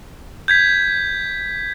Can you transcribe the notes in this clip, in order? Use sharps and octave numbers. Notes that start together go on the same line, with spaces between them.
G6 G#6 B6